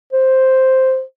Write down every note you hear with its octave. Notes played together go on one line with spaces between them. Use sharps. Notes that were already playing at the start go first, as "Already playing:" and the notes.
C5